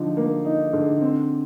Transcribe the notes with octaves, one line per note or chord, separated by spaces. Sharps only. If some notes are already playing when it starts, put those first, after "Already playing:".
Already playing: D3 F3 D#4
A#3
D#4
D3
C4